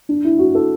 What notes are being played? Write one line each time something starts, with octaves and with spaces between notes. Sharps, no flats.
D4
E4
F#4
A4